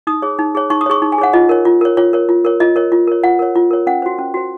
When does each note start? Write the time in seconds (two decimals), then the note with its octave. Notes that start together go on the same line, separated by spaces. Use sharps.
0.07 D#4 D#6
0.22 G#4 C#5
0.39 D#4
0.55 G#4 C#5
0.70 D#4 C#6
0.81 D#6
0.86 G#4 C#5 C#6
1.02 D#4
1.12 G#5
1.18 G#4 C#5 F#5
1.33 F4 D#5
1.49 A#4 C#5
1.65 F4
1.81 A#4 C#5
1.97 F4 C#5
2.13 A#4 C#5
2.29 F4
2.45 A#4 C#5
2.60 F4 D#5
2.76 A#4 C#5
2.92 F4
3.07 A#4 C#5
3.24 F4 F#5
3.39 A#4 C#5
3.55 F4
3.71 A#4 C#5
3.87 C#4 F#5
4.02 F#4 C5
4.18 C#4
4.34 F#4 C5